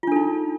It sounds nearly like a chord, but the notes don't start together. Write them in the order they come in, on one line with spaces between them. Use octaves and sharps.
F4 D4 A4 D#4